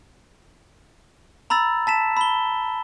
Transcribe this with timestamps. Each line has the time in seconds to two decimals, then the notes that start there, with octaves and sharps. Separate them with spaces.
1.50 A#5 B5 E6 A6
1.87 A5 B6 E7
2.17 B5 G7